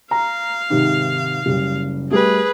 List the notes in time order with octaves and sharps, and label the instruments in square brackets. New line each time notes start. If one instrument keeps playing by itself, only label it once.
[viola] F5 [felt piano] A#5
[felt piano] G#2 C3 D#3
F#1 G3
[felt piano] G3 A3 [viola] G#4 B4